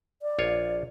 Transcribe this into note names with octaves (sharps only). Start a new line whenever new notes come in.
D5
A#1 F4 C#5